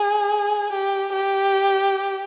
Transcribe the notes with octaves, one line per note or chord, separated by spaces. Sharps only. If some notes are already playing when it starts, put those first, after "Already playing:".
Already playing: G#4
G4
G4